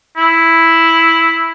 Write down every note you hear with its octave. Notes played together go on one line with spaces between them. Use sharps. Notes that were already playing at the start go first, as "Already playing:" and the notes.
E4